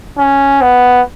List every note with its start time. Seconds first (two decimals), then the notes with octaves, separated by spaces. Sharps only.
0.18 C#4
0.61 B3